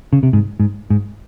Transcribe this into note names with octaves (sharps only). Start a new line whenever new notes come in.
C#3
C3
G#2
G#2
G#2